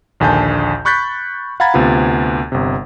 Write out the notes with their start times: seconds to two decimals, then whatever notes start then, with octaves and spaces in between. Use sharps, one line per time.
0.20 A#1 D#2 D3 G#5 A5 G6
0.85 B5 C#6 F#6 G6 A6 B6
1.60 F5 F#5 A#5 B5 G#6 A6
1.74 D2 C3 B3 F4
2.52 G1 C3